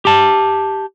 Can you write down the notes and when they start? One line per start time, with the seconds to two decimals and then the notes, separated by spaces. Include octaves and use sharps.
0.05 G4 A5